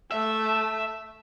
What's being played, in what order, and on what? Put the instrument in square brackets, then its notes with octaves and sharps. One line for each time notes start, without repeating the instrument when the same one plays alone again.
[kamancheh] A3 [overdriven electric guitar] E5